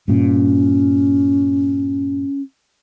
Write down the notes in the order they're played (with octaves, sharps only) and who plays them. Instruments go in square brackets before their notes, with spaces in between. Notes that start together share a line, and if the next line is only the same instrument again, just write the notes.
[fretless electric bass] G2 A#2 [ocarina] C#4